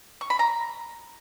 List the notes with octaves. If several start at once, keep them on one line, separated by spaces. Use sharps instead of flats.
C#6
B5
A#5